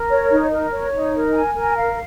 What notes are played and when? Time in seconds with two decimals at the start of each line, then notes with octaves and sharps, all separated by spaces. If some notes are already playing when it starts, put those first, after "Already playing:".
Already playing: A#4
0.10 C#5
0.30 D#4
0.51 A#4
0.73 C#5
0.93 D#4
1.14 A#4
1.34 G#5
1.54 A#4
1.76 F5